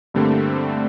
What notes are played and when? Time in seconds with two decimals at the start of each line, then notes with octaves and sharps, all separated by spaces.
0.14 G2 D3 G3 A3 A#3 C4